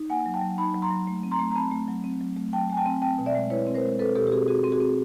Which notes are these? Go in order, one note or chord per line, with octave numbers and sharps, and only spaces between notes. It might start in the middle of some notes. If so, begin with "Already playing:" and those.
Already playing: D#4
A#3 F#5 G#5
F#3
G5 A5
F#3
D#4 A5 B5
F#3
A#5 C6
F#3
A3
C4
A#5 C6
A3
A#5
C4 A5 B5
A3
F#3
C4
F#3
A3
F#3 G5 A5
A3 G#5
G5 A5
C4
C4 G5 A5
B2
D5 E5
G#3
E4 B4 C#5
C4
A#4 C5
G#3
C4 A4 B4
B2 G4 A4
G4
C4 F#4 G#4
C4 F#4 G#4
C4
F#4 G#4
C4